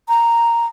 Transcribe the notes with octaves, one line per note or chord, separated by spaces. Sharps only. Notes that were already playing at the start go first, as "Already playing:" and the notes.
A#5